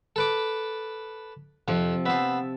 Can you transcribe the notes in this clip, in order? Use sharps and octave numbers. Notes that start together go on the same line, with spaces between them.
A4 B4 D6
F2 C3 F3
B3 C5 E5 A5